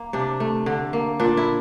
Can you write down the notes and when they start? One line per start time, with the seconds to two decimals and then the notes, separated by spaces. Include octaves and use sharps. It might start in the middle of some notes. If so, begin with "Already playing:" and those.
Already playing: A#3
0.13 C3 D4
0.40 A3
0.66 D3
0.93 A#3
1.20 A#2 D4
1.37 E4